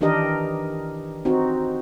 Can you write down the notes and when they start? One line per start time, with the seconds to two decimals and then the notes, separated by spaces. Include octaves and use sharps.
0.01 D#3 E3 D4 G4 A#4 D#5
1.25 C4 D#4 F#4